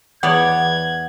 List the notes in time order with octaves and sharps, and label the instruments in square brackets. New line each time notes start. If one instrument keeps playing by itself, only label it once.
[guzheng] E2 C#5 D5 [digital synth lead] F#5 [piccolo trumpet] G#6